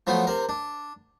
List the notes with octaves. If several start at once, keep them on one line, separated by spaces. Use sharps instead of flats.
F3 F#3 A3 B3
C3 A#4
D4